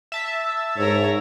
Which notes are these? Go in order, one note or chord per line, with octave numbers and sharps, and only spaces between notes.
E5 A5
G#2 A#4 C#5